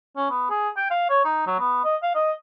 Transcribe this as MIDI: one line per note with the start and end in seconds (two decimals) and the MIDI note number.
0.16 0.26 61
0.30 0.48 59
0.50 0.69 68
0.77 0.87 79
0.91 1.05 77
1.10 1.24 73
1.25 1.43 63
1.47 1.54 54
1.59 1.84 59
1.85 1.96 75
2.03 2.13 77
2.15 2.31 75